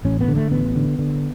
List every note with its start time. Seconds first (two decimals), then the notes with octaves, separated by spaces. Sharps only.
0.05 A1 C#4
0.21 B3
0.28 D3
0.36 A3
0.51 A1 B3
0.76 D3
0.99 D3